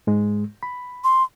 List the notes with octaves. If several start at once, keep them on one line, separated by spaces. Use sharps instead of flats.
G#2 G#3
B5
C6